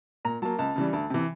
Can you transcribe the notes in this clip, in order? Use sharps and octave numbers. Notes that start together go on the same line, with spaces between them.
A#2 A#5
F#3 A#3 A5
C#2 A5
C#3 E3 G3
D2 A5
C3 E3